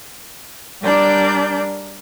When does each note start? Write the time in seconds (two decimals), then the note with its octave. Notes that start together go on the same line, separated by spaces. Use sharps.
0.82 G3 D4 A#4 D5 G6